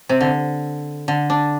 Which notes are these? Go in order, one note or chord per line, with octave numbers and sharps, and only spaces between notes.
C3
D3
D3
D4